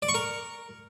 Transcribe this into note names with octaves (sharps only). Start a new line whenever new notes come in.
D5
C#6
A#4